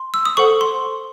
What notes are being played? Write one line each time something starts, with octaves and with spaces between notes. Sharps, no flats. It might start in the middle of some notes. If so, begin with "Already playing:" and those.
Already playing: C6
E6
D#6
A4 C5 F#5 C#6
C6